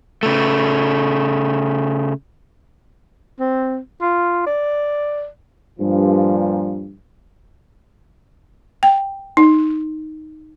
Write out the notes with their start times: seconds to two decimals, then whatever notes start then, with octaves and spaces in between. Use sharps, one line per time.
0.23 C#3 A3
3.39 C4
4.01 F4
4.46 D5
5.79 G2 A#2 F3
8.83 G5
9.37 D#4